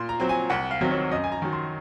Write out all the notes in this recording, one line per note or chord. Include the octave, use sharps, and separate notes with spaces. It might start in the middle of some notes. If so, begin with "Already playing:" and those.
Already playing: A#2 C6
A#5
F#3 C4
G#5
C2 F#5
F5
C3 D#3 F#3 C4
C#5
F#2 D#5
G#5
A#5
D#3 F#3
C6